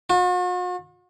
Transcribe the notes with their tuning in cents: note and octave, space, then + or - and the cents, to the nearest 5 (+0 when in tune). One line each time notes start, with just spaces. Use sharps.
F#4 -45